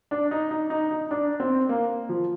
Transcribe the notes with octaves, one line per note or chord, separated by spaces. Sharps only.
D4
D#4
D#4
D#4
D#4
D4
C4
A#3
F3